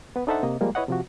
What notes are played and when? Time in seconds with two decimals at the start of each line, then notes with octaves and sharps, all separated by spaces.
0.16 B3 B4
0.27 D4 D#4 A4 C5 E5 F#5
0.43 C3 A#3 D#5
0.61 F3 G3 G#3 A#3
0.75 E4 B4 C#5 D#5 F#5
0.88 C3 F3 F#4